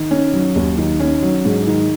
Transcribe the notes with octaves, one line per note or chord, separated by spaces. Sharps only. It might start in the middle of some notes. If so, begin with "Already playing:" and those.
Already playing: D#3
C#4
F#3
D#2
D#3
C#4
F#3
G#2
D#3